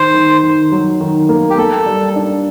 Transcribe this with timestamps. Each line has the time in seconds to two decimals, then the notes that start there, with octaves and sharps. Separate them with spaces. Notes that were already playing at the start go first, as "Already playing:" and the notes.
Already playing: D#3 C5
0.14 D#3
0.43 D#3
0.72 F#3
1.01 D#3
1.29 A#3
1.50 G4
1.58 A#3 A4
1.86 G3
2.16 D4